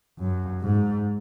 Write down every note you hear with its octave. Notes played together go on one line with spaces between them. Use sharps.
F#2
G#2